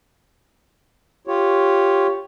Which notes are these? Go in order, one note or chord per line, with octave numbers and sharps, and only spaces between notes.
F4 G4 C#5